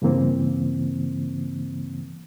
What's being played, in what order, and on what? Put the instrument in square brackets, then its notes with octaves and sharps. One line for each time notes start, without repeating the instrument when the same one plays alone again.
[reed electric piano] G2 C#3 E3 A#3 C4